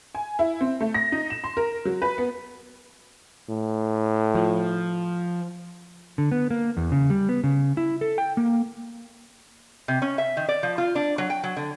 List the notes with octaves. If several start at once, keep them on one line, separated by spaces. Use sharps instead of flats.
G#5
E4
C4
A3
A#6
D#4
E7
C6
A#4
F#3
B4
B3
A2
F3
D3
B3
A#3
E2
C#3
G3
B3
C#3
E4
A4
G5
A#3
C3
C#4
E5
D#3
D5
F3
F4
D4
F#3
G5
F#3
D3